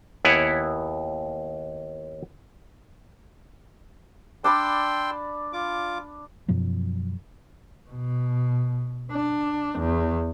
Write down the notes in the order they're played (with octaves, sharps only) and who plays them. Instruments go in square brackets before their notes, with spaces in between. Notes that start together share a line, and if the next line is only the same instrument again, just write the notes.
[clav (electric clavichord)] D#2 B3 E4 C#5 F#5 G#5
[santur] D4 D5 B5 [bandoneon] G5 C6 E6
[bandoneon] F4 D6
[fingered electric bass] F#2 B2 F3 F#3
[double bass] B2
D4
E2